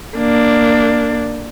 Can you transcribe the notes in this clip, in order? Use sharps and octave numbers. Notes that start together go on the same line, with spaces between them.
A#3 D4